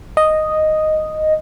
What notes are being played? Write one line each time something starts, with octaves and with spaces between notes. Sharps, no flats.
D#5